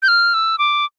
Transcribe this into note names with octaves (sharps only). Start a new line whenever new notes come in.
G6
F6
E6
D6